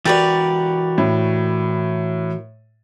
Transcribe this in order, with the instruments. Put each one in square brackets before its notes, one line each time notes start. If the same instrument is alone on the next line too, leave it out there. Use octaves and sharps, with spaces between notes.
[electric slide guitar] E3 F#4 A#4 [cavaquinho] G4 B4 D5 [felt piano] A6
[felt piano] A2